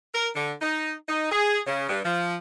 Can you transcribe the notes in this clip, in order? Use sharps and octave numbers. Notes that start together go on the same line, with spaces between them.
A#4
D3
D#4
D#4
G#4
C#3
G2
F3